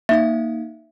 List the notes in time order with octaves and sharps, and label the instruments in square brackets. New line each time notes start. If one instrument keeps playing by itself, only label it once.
[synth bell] A#3 D#4 F5 [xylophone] E5